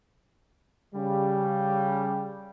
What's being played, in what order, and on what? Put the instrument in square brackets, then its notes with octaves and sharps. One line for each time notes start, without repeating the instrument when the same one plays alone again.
[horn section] C#3 G3